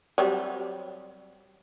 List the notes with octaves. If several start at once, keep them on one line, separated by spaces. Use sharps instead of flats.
F#3 G3 C4